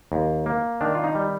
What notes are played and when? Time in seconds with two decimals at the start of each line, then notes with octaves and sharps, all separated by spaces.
0.12 D#2
0.46 A#3
0.81 D#3 D4
0.95 F4
1.04 D#4
1.15 G3